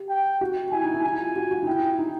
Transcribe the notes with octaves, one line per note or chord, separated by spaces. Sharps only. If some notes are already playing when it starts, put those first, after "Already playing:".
Already playing: G4
G5
F#4
E4 G#5
D#4
E4
E4 G#5
F4
F#4
F#4
D#4
E4 G5
D#4